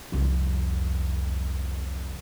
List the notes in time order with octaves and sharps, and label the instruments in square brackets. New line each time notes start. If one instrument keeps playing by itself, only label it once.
[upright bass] C2 F2